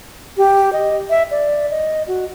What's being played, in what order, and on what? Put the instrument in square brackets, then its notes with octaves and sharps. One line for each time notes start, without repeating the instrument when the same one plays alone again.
[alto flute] G4
D#5
E5
D5
D#5
F#4